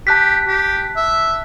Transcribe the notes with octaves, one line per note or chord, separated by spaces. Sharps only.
G4 A5 F#6 B6
G4
E5